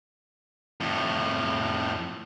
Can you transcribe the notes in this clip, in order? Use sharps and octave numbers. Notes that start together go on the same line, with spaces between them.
F2 A2